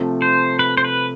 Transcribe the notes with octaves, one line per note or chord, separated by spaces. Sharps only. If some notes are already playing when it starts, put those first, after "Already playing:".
Already playing: C3 F3 A3
C5
B4
C5
B4